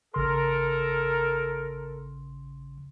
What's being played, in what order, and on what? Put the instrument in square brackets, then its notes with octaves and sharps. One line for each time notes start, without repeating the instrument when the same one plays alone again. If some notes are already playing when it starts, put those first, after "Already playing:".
[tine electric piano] A1 C#3 C6 [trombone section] A4 A#4